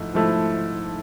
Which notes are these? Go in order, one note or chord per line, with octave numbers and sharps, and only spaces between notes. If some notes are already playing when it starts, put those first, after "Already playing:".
Already playing: G#2 F3 A3 E4
G#2 F3 A3 E4